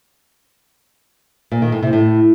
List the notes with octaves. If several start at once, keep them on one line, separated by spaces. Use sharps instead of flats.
A#2
D#3
A2
C3
A2